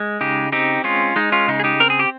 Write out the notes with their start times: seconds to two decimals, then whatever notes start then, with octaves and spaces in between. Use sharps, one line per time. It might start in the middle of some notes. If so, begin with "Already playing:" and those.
Already playing: G#3
0.21 C#3 D#4 G4
0.52 C4 D#4 G4
0.84 G#3 C#4 F4
1.16 G#3 D#4
1.32 C#4 F4
1.48 C#3 D#4
1.60 G#4
1.64 D#4 G4
1.80 C4 A#4
1.90 G#4
1.99 G4